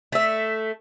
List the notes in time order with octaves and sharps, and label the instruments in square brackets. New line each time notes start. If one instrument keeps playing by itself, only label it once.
[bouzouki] A3 E5